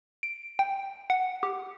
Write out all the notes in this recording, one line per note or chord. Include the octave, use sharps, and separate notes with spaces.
D7
G5
F#5
G4